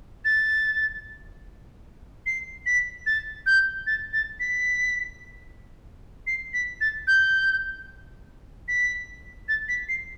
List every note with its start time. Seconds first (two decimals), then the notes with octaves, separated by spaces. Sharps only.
0.25 A6
2.26 C7
2.66 B6
3.06 A6
3.46 G6
3.87 A6
4.13 A6
4.40 B6
6.27 C7
6.54 B6
6.81 A6
7.07 G6
8.68 B6
9.49 A6
9.69 B6
9.89 C7